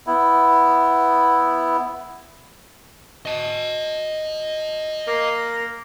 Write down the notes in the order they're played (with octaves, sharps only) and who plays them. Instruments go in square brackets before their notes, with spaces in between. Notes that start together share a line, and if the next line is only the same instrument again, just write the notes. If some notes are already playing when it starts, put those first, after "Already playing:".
[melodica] B3 E4
[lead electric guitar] D#5 A5
[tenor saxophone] A#3